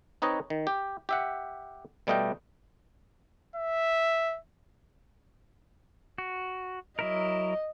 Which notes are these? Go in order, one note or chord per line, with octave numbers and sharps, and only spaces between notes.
C4 D#4 B4 C#5 D#5
D#3
G4
G4 E5 F#5
B2 G3 A3 D#5 F5 G5
E5
F#4
F#3 E4 A#4 D#5